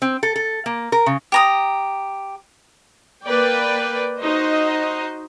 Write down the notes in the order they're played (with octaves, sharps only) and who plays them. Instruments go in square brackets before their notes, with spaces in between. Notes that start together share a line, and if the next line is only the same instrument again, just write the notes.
[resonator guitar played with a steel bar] C4
A4
A4
A#3
A#4
C#3
[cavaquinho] G4 A#5 D#6
[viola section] A#3 B4 D5 G5
D#4 F#4 C5 D#5